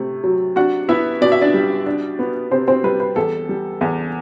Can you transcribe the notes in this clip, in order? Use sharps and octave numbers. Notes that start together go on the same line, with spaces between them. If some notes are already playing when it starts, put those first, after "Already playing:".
Already playing: C3 A3
F#3
D4 F#4 F#5
B3 E4 E5
B2 D5
E5
D4 D5
G3
D4
B3
C3 C4 C5
C4 C5
G3 B4
B4
E2 A4
G3
E2